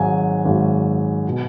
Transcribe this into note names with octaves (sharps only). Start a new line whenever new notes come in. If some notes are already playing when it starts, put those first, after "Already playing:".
Already playing: G#1 G#2 F#3 G#5
G#1 G#2 F#3
B2